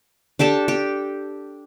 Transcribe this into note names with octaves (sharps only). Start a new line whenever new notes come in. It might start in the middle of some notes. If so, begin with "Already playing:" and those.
D4 G4 A4 A5
G4